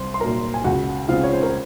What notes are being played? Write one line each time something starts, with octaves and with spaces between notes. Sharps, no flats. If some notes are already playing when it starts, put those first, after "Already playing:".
Already playing: C2 C5 C6
C6
A#2 F#3 A#4 A#5
G#5
C#2 F#4 F#5
C#3 G#3 C4 F4 F5
C#5
C5
A#4